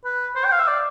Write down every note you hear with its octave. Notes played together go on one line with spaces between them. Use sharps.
B4
C5
G5
F5
E5
D5